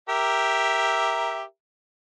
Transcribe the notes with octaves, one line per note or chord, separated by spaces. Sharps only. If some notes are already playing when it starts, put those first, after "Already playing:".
G4 A#4 E5